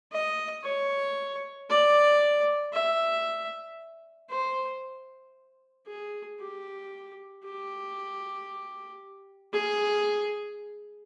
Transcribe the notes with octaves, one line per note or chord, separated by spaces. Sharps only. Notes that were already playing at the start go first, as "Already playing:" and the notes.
D#5
C#5
D5
E5
C5
G#4
G4
G4
G#4